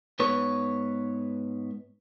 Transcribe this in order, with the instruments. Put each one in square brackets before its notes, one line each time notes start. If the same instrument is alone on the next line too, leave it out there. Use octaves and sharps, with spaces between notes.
[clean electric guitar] G#2 B3 B4 C#5